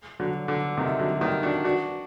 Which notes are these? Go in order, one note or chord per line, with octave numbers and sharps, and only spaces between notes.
D3 F#3
D3
C3 D#3
D3 F#3
D#3 G3
D4 F#4
D4 F#4